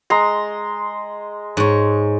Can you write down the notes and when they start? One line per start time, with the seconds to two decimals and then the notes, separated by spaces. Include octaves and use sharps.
0.10 G#3 A#5 C6
1.57 G#2 C#5